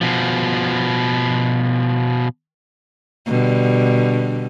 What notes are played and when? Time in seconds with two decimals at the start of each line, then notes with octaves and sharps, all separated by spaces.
0.01 B2 F3
3.26 B2 D3 G3